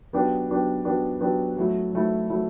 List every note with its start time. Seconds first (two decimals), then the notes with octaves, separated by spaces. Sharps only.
0.13 F#3 B3 D4 G4
0.49 F#3 B3 D4 G4
0.85 F#3 B3 D4 G4
1.20 F#3 B3 D4 G4
1.57 F#3 A3 E4
1.93 F#3 A3 E4
2.28 F#3 A3 E4